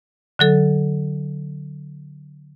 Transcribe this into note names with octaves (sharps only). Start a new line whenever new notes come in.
D3 F#3 A4